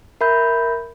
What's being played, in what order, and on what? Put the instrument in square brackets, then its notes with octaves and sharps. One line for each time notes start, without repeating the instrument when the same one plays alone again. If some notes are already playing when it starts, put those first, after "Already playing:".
[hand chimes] A#4 E5 B5 G6